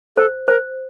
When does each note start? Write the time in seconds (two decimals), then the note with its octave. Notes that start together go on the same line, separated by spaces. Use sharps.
0.16 A4 C5
0.47 A#4 C5